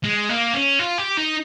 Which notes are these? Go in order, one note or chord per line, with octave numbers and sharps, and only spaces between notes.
G#3
A#3
C#4
F4
G4
D#4